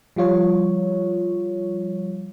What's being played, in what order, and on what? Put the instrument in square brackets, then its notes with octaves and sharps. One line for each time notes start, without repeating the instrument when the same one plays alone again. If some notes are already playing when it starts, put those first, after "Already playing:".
[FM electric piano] F3 G3 F4 C#5